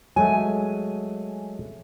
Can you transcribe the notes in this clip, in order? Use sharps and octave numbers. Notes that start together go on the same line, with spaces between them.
F#3 G#3 A3 G#5